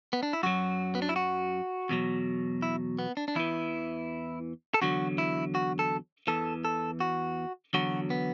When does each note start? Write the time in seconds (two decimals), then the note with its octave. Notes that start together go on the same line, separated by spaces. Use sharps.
0.13 B3
0.23 D4
0.33 E4
0.43 F#2 F#3 F#4
0.95 B3
1.02 D4
1.09 E4
1.16 F#4
1.89 E2 B2 F#3
2.62 E4
2.99 B3
3.17 D4
3.28 D4
3.35 E2 E3 E4
4.74 A4
4.81 E2 D3 F#3 F#4
5.18 E4
5.55 F#4
5.79 A4
6.27 E2 E3 A4
6.65 A4
7.00 F#4
7.73 E2 D3 F#3 F#4
8.10 B3